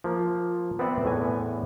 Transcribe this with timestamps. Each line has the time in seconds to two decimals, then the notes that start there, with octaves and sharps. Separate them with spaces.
0.04 F3 A#3
0.79 B3 C4 D5 E5 F#5
1.04 E2 A2 E3 G#5